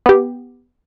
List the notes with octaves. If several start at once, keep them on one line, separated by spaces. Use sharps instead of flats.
B3 G4